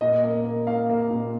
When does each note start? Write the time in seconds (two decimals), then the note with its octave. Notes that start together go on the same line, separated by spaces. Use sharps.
0.01 A#2 D#5
0.24 A#3
0.45 A#3
0.67 A#3 F5
0.89 A#3
1.10 A#2